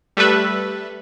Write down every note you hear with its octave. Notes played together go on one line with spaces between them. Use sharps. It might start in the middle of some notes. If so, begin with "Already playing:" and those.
G3 A3 A4 B4 E5